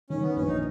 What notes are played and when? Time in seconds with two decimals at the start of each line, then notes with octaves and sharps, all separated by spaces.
0.10 D#3 C#4
0.23 B3
0.36 A#1 C#4
0.48 D#4